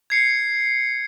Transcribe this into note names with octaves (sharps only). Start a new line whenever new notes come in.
G#6 C7 C#7